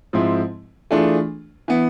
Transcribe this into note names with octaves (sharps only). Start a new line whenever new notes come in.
G#2 F3 G#3 C4 E4
E3 A3 D4 F4 G#4
E3 B3